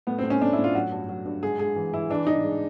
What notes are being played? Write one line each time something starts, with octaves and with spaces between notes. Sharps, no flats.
A2 B3
C4
A2
C#4
A2 D4
E4
A2
F4
F#3 F#4
G2
F#3
G2
G#2 G#4
G#3 G#4
E3
E3 E4
E3 D4
E3 D#4
G#3